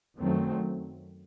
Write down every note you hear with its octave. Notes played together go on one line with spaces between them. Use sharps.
F#2 D#3 F#3 A3 C4